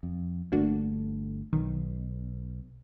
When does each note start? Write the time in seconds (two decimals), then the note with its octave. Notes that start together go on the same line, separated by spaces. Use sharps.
0.03 F2
0.52 G1 D3 A3 A#3 D4 F#4
1.53 B1 D#3